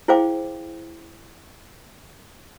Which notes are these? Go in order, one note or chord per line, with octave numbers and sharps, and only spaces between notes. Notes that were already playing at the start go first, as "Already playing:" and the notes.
E4 G#4 C5 F5 G5 D6